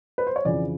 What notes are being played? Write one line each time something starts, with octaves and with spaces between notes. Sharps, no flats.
B4
C5
C#5
F2 C#3 E3 D5